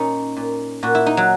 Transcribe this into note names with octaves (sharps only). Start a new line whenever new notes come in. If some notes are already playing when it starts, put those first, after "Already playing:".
Already playing: A#2 C#4 D#4
A#2
A#2 F#4
E4
D#4
F#3